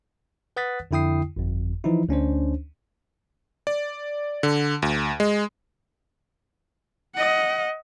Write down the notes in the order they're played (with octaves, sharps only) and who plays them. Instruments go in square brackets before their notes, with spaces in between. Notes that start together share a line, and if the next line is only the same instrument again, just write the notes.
[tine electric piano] B4 F#5 D#6 F#6 A6 B6
F2 D3 E4 G5 D#6 C7
G1 F2
E3 F3 D#4 E4
D2 C#4 D4 C5
[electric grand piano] D5
D3
D2
G#3
[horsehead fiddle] D#5 F#5